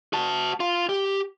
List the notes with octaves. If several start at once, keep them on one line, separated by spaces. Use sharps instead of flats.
F#4 A5
F4
G4